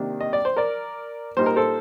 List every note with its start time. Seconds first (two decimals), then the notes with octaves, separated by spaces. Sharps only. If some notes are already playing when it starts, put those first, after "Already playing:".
Already playing: C3 D#3 A#3 D4
0.21 D#5
0.33 D5
0.45 C5
0.57 A#4 D5
1.37 A#2 G3 A#3 D#4 C5
1.46 A#4
1.56 A4 C5